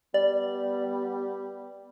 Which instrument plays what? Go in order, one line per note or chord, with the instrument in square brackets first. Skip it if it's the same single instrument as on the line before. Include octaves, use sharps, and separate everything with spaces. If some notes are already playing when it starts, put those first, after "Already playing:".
[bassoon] G3 [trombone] B3 [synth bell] D5